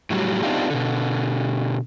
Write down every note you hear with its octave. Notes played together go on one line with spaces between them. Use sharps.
A2 F#3 G3
B3 C4 D4 D#4 F4 G4
B2 D3